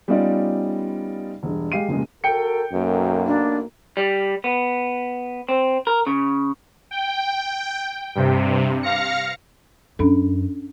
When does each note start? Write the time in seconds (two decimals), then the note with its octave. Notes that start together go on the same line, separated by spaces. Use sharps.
0.08 G3 B3 C#4 D#4 F4 D5
1.43 E1 G2
1.72 G#3 G4 F5 C7 D#7
1.88 F1 A#2 C#3 G#3
2.24 F#4 A4 A#4 G5 C#7
2.72 B1 F#2 A#3
3.27 D4
3.97 G3
4.44 B3
5.49 C4
5.87 A#4
6.07 C#3
6.91 G5
8.15 G2 C3
8.83 F5 A#6 C#7
9.99 F#2 C#4 D4 A4